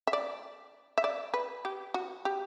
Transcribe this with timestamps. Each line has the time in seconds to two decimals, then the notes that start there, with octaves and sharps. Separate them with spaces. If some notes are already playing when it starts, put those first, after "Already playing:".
0.07 E5
0.13 D5
0.98 E5
1.04 D5
1.34 B4
1.65 G4
1.94 F#4
2.25 G4